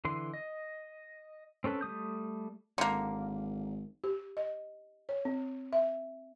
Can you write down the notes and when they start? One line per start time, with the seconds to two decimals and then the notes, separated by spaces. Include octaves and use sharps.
0.05 D3 E3 C6
0.34 D#5
1.64 C4 C#4 A4 B4
1.81 G3 A3 D#6 G6
2.78 G#1 D3 A#3
4.04 G4
4.37 D#5
5.09 C#5
5.25 C4
5.73 E5